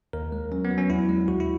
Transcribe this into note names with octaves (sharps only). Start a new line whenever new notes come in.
D#2 A#4
G#3
F#3 C#4
B3
F#3
C#4
E2 E4
G#3
D#2 F#4
E4